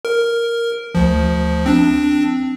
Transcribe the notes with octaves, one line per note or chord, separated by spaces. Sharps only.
A#4
D2 F3
C4 D4